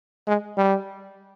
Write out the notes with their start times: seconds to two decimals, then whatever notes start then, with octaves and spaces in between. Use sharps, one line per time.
0.27 G#3
0.57 G3